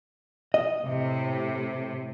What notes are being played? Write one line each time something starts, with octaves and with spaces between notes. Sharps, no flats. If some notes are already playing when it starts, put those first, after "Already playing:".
D#5
A2 C3